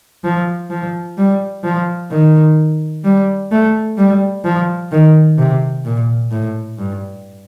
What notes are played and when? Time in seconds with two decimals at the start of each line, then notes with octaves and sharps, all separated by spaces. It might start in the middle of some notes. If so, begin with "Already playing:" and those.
0.24 F3
0.70 F3
1.18 G3
1.64 F3
2.11 D#3
3.05 G3
3.52 A3
3.97 G3
4.44 F3
4.92 D#3
5.38 C3
5.85 A#2
6.31 A2
6.78 G2